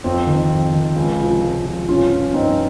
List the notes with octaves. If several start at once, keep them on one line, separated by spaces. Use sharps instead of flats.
F2 C4
D#3
F2
D#3
C#2
C3 F3
C#2
C3 F3
G2 C#4 F4
F3
G2 C4 D#4